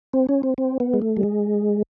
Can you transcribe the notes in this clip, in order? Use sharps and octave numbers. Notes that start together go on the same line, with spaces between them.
C4
C#4
C4
C4
B3
G#3
A3
G3
G#3